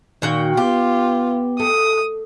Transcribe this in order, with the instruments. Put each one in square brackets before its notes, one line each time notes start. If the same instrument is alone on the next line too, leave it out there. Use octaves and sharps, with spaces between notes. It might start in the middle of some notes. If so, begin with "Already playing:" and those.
[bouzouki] A#2 F#4 G5 [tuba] D#3
[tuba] B3 [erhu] F4 [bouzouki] G4
[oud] A3 [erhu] D#6